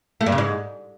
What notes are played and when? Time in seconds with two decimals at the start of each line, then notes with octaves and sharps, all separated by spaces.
0.21 A3
0.26 G2
0.32 C#3
0.38 G#2